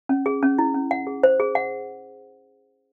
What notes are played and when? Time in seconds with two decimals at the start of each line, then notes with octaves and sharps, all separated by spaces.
0.09 C#4
0.26 G#4
0.43 C#4
0.59 E4
0.74 C#4
0.91 F#5
1.07 G#4
1.23 C5
1.40 G#4
1.55 F#5